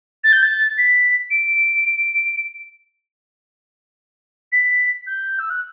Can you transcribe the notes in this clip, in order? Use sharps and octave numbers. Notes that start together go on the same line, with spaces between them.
A6
G6
A6
B6
D7
B6
G6
E6
F#6